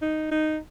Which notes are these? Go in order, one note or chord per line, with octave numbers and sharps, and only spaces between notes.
D#4
D#4